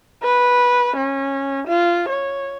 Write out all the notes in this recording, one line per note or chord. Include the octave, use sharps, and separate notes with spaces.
B4
C#4
F4
C#5